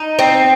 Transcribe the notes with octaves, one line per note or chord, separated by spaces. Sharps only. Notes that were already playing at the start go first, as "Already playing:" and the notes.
Already playing: D#4
C4